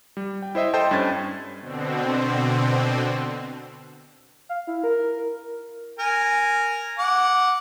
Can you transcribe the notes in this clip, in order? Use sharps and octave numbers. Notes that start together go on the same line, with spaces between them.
G3
G5
E4 C5 D#5 E5
A4 C5 D#5 G5 A5 C6
G2 C#4 G#6 A6
B2 D3 C4
F5
E4
A#4
A#4 G#5
F#5 D6